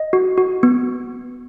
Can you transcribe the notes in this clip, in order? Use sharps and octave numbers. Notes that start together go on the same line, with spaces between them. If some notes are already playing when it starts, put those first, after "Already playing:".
Already playing: D#5
F#4
F#4
B3